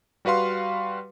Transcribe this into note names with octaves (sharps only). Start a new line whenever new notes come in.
G3 F#4 B4 F5 C6